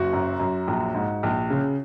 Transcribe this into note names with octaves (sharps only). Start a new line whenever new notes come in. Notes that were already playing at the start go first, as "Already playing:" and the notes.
Already playing: F#1 F#4
F#2
F#2
A#1
G#2
A#1
C#3